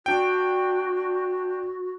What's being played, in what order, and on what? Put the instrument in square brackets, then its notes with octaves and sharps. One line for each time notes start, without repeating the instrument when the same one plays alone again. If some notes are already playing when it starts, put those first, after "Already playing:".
[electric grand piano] D4 G5 [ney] F#4